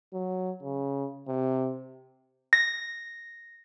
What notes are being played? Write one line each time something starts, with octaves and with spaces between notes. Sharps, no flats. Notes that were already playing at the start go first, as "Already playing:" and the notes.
F#3
C#3
C3
A#6